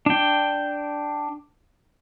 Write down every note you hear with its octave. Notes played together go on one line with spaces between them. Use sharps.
D4 G5